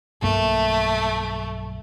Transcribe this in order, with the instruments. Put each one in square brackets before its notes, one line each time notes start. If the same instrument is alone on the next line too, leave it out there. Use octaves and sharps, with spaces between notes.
[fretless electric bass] B1 G2 A#3 [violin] A3